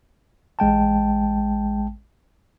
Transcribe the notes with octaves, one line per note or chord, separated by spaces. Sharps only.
A1 G#3 G5 A5